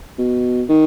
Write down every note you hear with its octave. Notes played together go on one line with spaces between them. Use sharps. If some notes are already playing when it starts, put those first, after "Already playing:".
B2
D#3